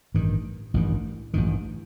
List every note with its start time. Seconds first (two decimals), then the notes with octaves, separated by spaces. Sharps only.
0.14 A1 G2 D#3
0.74 A1 G2 D#3
1.34 A1 G2 D#3